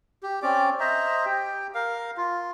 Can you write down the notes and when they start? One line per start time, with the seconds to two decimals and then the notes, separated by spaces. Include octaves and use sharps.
0.23 G4
0.42 C4 C#4 D5 D6
0.80 C5 D#5 E5 A#5
1.26 G4 G5
1.74 A#4 F5
2.17 F4